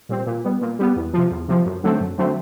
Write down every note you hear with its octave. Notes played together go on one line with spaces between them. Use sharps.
A#2 G3 C4
A#2
G3 B3
A#2
G3 B3
E2
C3 F3
E2
C3 F3
F#2
D3 F#3 A3 C4
F#2
D3 F#3 A3 C4